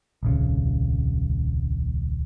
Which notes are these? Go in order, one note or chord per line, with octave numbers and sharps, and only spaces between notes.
D#1 C2 C#3